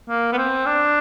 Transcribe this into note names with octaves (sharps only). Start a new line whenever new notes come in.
A#3
B3
C4
D4